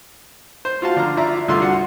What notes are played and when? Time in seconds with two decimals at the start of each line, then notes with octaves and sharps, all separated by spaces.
0.65 C5
0.82 F4 F#4 F5 A5
0.96 D3 F3 A#5 F6
1.17 E4 F4 D5 E5 A#5
1.48 C2 G2 D3 F4 A4 C6
1.61 F#4 F#5